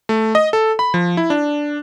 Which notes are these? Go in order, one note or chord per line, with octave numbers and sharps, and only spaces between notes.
A3
D#5
A4
B5
F3
E4
D4